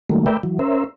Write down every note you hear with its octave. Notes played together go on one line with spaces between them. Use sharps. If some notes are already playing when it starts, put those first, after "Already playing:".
D#3 F#3 G3 A3 A#3
A3 A#4 B4 D5 E5 G5
E3 F#3
C#4 A#4 C5 E5